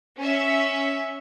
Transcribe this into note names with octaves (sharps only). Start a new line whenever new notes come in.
C#4 E5